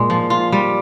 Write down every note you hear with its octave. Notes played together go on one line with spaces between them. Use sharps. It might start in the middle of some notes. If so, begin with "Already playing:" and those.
Already playing: A#2 G#3
F3
F4
G3